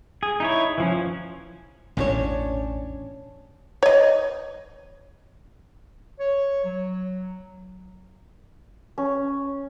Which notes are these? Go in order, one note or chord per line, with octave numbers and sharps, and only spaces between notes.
G#4
D#4 E4 C#5
E3 F3 C#4
A1 E2 B2 C#4 D4 C#5
C#5 D#5
C#5
F#3
C#4